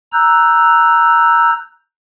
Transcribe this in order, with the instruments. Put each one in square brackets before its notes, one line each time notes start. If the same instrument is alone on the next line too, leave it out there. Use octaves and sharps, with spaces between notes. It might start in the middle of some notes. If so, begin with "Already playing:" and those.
[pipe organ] A#5 E6 F#6 G6